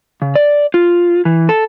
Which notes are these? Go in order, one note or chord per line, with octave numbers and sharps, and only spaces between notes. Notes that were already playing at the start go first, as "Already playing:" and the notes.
C#3
D5
F4
E3
A4